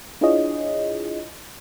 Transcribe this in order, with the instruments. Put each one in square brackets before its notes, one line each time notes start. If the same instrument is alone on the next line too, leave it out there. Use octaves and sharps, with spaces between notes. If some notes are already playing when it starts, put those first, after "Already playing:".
[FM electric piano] D4 E4 F4 G#4 C#5 D#5